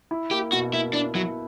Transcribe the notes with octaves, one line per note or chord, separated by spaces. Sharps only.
E4
A#3 G4
B2 F#4
A#3 E4
D4 E4
F#3 E4